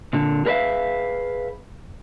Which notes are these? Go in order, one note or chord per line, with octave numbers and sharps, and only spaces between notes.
A#2 D3
G#4 A#4 B4 D5 E5 F5